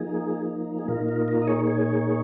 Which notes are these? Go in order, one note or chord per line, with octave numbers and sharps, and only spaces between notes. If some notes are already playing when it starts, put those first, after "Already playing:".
Already playing: F3 A#3 D#4 G#4
G#4
A#2 A#3 D#4 F4 A#4
F4 A#4
F4 A#4
D#5
G#4 C#5
G#4 C#5